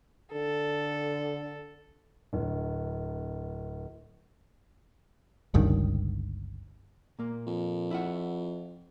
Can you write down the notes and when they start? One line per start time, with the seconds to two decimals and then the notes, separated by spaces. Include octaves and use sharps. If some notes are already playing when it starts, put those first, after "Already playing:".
0.33 D3 A4
2.33 D1
5.54 G1 C#2 G2 D#3
7.19 A#2 A#3
7.47 F2
7.91 E4 F4 F#5